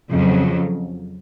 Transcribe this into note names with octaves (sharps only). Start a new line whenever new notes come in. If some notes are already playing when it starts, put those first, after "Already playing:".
F2 C#3 F#3